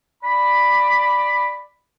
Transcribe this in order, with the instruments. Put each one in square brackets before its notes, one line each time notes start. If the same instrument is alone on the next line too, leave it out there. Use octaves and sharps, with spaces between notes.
[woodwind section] D5 B5